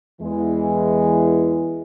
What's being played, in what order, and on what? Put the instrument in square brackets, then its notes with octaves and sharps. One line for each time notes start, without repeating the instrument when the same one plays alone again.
[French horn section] E2 E3 G#3